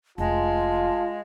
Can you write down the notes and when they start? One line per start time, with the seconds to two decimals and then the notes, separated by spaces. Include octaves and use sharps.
0.18 F1 G#3 F4 A5